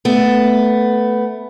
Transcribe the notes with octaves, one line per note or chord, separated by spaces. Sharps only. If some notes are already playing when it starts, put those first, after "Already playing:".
A3 B3